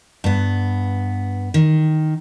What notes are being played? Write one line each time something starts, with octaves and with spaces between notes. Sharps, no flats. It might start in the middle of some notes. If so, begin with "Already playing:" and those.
G2 B3
D#3